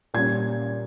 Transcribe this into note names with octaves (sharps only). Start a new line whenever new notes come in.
A#2 G3 C#4 G#6